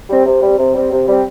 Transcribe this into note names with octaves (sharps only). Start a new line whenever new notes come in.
G3 C4
C3
G3 C4
C3
G3 C4
C3
G3 C4